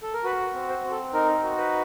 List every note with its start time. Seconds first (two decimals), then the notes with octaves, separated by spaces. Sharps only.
0.03 A4
0.14 A#4
0.24 F#4 B4
0.54 C4
0.69 C5
0.84 C4
0.91 A4
1.14 D#4 A#4
1.44 F#4
1.58 B4